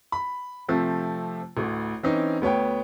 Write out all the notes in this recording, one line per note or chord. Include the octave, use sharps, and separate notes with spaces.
B5
C3 F3 A3 C4
A1 D2
E3 C4 C#4 D#4
D2 B3 C#5 G5